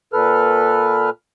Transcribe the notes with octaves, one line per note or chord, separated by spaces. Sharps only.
A#2 A4 B4 F6